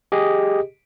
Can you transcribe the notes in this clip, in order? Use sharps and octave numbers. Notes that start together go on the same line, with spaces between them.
G4 G#4 D#5